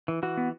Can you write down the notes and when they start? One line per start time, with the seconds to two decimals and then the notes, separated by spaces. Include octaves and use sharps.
0.08 E3
0.23 E3 F#4
0.37 B3